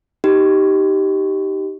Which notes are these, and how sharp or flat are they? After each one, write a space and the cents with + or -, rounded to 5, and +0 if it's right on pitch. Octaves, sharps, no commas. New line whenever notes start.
D#4 +0 G4 -15 C6 -45